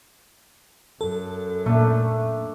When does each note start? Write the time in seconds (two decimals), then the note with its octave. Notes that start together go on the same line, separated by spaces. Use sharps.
1.01 F#2 A4
1.66 A#2 A3 D4